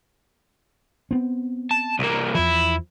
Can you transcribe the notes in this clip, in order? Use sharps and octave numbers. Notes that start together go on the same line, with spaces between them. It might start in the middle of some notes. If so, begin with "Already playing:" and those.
B3 C4
A5
C2 A#3
E2 F3 E4